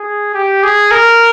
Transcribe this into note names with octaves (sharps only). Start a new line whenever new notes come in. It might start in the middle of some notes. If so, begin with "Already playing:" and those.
Already playing: G#4
G4
G#4
A#4